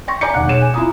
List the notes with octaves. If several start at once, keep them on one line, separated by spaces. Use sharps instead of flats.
G5 C6 C#6 A#6
D5 G#5 A#5 D6 G6 C#7
E1 D#2 F#5 F#6
B1 G#4 C#5 E7
G#5
E4 F4 A#5 D#6